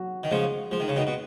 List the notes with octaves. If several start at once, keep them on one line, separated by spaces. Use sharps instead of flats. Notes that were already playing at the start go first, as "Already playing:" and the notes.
Already playing: F#3 F#4
D#3
C#3 F3 G#3
F3 G#3
D#3
C#3
B2 D#3
B2